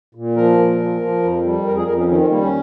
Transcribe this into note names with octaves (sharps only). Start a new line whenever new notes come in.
A#2
F3 A#4
A#2
F3
F3
F2
G3
F2 A#4
G#4
F2 A#4
C#4
D#3 C#4
C4
G3 A#3
C#4